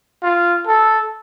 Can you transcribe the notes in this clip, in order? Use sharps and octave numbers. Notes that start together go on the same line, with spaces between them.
F4
A4